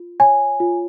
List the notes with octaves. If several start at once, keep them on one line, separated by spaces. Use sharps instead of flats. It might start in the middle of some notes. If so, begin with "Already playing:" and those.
Already playing: F4
C#5 G#5
F4